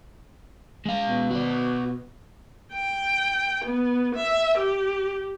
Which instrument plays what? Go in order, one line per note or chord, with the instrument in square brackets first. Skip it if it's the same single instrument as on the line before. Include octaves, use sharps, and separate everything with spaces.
[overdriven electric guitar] G#3 F5
[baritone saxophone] B2
[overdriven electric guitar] F#4 D5
[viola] G5
B3
E5
G4